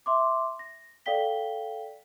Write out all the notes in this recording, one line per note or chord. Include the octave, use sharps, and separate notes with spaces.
E5 C6 D6
A#6
A4 D5 F5 G5 B6 G7